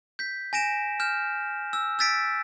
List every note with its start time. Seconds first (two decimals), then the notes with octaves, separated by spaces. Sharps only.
0.19 G6 B6
0.53 G#5 A#6 D7 E7
1.00 F6 G6 E7
1.73 E6
1.99 E6 G6 A6 B6 D7